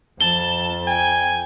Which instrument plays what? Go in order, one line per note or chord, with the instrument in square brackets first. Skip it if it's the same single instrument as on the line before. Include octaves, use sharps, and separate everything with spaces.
[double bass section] F2 [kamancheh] A5 [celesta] G7
[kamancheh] G5 [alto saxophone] G#5